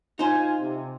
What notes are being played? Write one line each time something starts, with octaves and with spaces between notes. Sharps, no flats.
D#4 F4 C5 G#5
C3